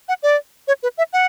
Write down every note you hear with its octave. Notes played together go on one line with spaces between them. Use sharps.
F#5
D5
C#5
B4
E5
F#5